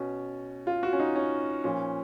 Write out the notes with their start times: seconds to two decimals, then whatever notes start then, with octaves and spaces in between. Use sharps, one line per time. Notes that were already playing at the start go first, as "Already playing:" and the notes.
Already playing: B2 C#4
0.67 F4
0.83 F#4
0.93 C#4
1.00 D#4
1.16 C#4
1.64 A#2 F3 C#4